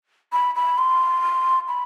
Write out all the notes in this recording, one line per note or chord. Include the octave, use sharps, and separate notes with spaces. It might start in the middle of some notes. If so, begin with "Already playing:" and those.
B5
B5
C6
B5